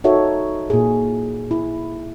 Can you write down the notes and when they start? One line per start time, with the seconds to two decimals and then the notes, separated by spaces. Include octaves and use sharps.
0.04 D#4 F#4 A4 C#5 E5
0.70 A#2 G#4
1.51 E4